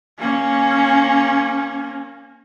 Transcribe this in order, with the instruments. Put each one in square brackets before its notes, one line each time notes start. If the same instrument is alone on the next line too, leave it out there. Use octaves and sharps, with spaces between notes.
[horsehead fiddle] A#3 C#4